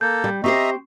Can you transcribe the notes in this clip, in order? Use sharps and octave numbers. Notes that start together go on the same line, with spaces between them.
A#3 A4 G6
G3
C4 G4 C5 D#5 E5 A#5 C#6 C7